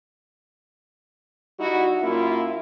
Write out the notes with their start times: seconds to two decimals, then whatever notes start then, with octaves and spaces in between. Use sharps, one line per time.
1.59 G3 D#4 E4 F#4
2.03 F#2 A#3 E4 F4